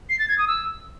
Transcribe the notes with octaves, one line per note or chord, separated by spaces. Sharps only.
C7
A6
G#6
D#6
E6